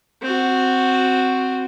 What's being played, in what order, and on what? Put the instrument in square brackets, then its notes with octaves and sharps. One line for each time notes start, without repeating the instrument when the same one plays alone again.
[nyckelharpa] C4 F#4